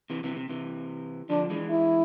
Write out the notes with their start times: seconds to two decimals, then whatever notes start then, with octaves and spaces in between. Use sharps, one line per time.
0.10 C3 E3
0.24 C3 E3
0.36 C3
0.49 C3 E3
1.30 D3 F3 D4
1.50 E3 G#3
1.70 E4